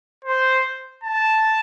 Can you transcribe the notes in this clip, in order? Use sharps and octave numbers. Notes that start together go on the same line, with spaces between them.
C5
A5